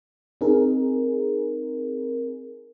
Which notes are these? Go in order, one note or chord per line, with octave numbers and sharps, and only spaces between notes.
C4 D#4 G#4 A#4